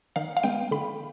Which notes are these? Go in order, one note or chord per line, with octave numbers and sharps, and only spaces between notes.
D#3 F5
F5
G#3 B3 G5
D3 B5